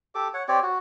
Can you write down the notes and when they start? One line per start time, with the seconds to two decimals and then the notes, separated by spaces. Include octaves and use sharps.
0.15 G4 A4 D6
0.34 C#5 F#5
0.48 C4 G4 C#5 D5
0.63 F#4